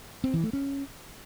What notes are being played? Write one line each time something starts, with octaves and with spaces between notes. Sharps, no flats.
C4
E3
A3
C#4